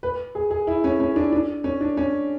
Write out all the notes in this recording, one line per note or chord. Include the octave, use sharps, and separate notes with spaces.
B4
G#4
G#4
E4
C#4
C#4
D4
D4
C#4
D4
C#4